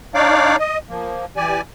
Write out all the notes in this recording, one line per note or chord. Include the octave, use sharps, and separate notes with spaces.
D4 D#4 C#5 D5 F5 D6
D#5
F3 A#3
E3 G4 D5 G#5